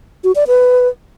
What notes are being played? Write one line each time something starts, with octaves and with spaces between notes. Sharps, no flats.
F#4
D5
B4